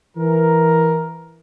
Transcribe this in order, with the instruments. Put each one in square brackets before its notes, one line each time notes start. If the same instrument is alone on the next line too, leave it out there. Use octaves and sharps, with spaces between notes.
[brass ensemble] E3 A#4